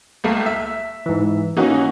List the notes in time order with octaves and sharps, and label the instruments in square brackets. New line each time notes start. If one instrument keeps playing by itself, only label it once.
[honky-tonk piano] C#2 A3 A#3
E5
[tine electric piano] G#2 E3
[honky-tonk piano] E3 D#4 F#4 [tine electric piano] A#3 C#4